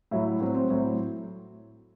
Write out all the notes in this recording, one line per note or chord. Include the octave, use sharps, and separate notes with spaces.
A2 F#3 E4
A2 F#3 C4
C4
A2 F#3